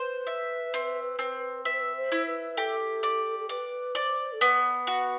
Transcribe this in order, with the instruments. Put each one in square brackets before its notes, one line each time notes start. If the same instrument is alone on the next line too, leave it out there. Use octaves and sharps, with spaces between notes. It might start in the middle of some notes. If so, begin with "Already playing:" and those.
Already playing: [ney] B4 [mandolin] C5
[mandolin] E5
C4
C4
[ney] B4 [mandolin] E5
[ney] C5
B4
C5
[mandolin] E4
[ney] B4
[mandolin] G4 [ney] A4
[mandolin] D5
[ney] A4
[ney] B4 [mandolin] D5
[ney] C5 [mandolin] D5
[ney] A4
[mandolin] B3 [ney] B4
[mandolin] F#4